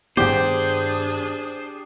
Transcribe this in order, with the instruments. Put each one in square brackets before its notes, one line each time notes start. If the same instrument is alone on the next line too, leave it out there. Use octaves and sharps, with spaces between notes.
[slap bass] G2 D#3 B3 [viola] D4 G#4 [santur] G4 G5 [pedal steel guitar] C5